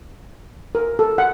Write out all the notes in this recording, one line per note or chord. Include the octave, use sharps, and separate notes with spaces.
A#4
A4
F#5